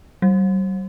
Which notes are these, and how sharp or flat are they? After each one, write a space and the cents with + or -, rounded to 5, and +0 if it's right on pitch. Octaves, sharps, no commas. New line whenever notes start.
G3 -45